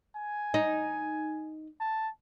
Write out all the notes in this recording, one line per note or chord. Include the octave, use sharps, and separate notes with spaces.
G#5
D#4
A5